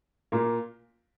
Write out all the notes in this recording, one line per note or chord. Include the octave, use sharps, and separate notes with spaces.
A#2 A#3